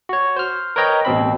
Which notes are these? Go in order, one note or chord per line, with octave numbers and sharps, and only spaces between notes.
F#4 C#5
C5 F6
A#4 B4 C#5 D#5 G5 A#5
A1 B2 C4 B5